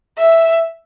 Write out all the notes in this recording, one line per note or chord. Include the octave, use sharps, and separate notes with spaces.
E5